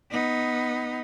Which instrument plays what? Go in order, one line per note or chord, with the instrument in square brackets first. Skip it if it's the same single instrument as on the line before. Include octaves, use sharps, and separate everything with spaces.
[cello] B3 D#4